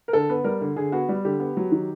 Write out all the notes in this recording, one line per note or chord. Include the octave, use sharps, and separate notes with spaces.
A#4
D3 A4
B3 B4
G3 A#4
D3
D3 G#4
B3 F#4
G3
D3 G4
B3
F#3
D#3